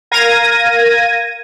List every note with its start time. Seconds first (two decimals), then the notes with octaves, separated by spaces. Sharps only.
0.11 A#4 F5 G#6 A#6 D#7